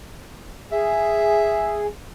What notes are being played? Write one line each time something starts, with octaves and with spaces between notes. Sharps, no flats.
G#4 E5